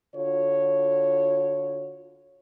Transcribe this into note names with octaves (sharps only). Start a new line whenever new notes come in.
D3 F4 F#4 C#5